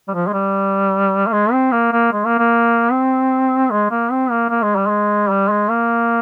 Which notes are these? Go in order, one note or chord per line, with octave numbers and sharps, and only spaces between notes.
G3
F3
G#3
G3
A#3
G#3
C4
A#3
A#3
G#3
A#3
A#3
C4
G#3
A#3
C4
A#3
A#3
G#3
G3
G#3
G3
G#3
A#3